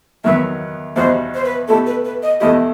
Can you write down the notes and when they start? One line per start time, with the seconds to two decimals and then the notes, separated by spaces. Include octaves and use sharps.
0.24 E2 D#3 F#3 B3 E5
0.96 E2 B2 G3 D#4 F#4 C5
1.35 C5
1.44 B4
1.68 B2 A3 E4 G4 A4
1.86 B4
2.05 B4
2.23 D#5
2.40 E2 B2 A3 E4 G4 D#5